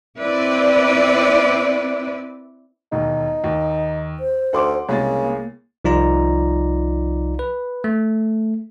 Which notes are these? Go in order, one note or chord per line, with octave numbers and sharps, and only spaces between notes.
C4 E4 B4 D5
E1 D#2 D#4
D#2
C5
D2 F#5 C6 D6
C2 C#3 G#3 A#3 A6
C2 F3 D#4 F4 D5 A#5
B4
A3